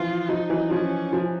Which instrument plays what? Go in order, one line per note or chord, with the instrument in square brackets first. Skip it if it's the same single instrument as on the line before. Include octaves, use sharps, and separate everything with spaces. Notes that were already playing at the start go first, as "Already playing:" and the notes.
Already playing: [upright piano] E3 F3 [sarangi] F4
[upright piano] F3 [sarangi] D#4
[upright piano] E3 F#3
[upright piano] F3 [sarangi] C#4
[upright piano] F3